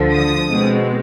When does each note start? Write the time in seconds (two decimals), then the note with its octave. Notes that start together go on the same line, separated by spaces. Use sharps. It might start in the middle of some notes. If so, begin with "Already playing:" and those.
Already playing: D2 D3 F3
0.13 D#6
0.50 B2 G#3 C4